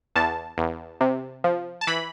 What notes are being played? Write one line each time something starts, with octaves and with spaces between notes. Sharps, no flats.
E2 A5
E2
C3
F3
A5
E3 B5